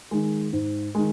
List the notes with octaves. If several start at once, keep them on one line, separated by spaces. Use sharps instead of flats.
D#3 G#3
G#2
D#3 G#3